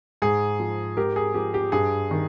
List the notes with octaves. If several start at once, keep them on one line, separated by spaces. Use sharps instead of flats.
G#2 G#4
F3
G#2 G4 A#4
G#4
F3 G4
G4
G2 G#4
D#3